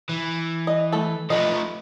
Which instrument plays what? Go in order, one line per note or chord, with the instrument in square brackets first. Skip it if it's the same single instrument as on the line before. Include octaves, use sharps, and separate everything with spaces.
[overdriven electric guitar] E3
[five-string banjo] D#5
A3 A4
[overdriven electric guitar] F3 A3 [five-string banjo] B4 D#5